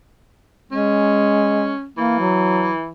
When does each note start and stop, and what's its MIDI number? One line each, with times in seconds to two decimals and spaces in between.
0.72 1.73 56
0.72 1.87 61
1.98 2.91 52
1.98 2.17 58
2.19 2.73 54